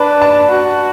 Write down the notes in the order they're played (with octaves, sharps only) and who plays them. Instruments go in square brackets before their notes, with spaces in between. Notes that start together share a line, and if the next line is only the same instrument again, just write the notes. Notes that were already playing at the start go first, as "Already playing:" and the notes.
Already playing: [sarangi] D4 [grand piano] B4
[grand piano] A5
[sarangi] F#4